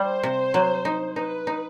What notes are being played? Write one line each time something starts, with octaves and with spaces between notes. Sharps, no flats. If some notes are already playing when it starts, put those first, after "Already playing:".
Already playing: G3 C5
C3
F#3
D#4
D#4 B4
D#4